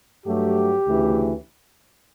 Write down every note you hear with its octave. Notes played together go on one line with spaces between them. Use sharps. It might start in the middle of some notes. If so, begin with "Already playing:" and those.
G2 F#3 A3 G4
D2 C#3 E3 A3